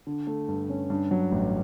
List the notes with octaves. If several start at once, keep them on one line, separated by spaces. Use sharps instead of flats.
D3
A3
G2
C#4
G2
F#3
A1